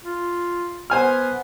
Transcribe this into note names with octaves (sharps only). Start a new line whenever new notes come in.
F4
B3 C5 G#5 F6